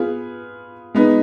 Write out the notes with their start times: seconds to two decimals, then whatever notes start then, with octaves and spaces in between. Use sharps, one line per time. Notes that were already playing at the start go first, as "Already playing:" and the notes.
Already playing: B3 F4 G#4
0.94 G#3 B3 D#4